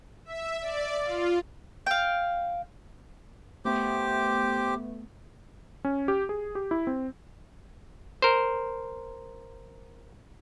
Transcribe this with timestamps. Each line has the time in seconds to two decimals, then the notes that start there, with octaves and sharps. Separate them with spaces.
0.25 E5
0.61 D5
1.04 F4
1.86 F5 G5
3.65 A3 B3 G4 C5 D6
5.85 C#4
6.08 G4
6.29 G#4
6.55 G4
6.71 E4
6.87 C4
8.22 A#4 C5